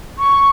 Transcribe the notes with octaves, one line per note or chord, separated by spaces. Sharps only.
C#6